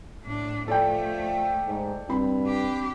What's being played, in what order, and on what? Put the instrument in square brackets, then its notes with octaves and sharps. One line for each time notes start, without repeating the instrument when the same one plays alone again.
[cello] A2 D4
[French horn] F3 [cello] A3 [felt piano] A4 D5 G5
[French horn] G#2
[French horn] G2 [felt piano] C4 B5
[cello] D4 G4